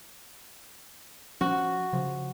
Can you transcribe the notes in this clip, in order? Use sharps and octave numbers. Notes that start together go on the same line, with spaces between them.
F3 C#4 F#4
C#3 F3